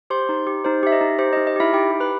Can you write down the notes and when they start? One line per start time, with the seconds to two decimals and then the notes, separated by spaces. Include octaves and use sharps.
0.10 G4 C5 C6
0.29 D#4
0.47 G4
0.64 D#4 C5
0.83 G4 E5
0.92 D#5
1.01 D#4
1.19 G4 C5
1.33 D#5
1.37 D#4
1.47 D#5
1.56 E4 G4 E5
1.73 D#4 G4 G5
1.91 G4
2.00 B4 B5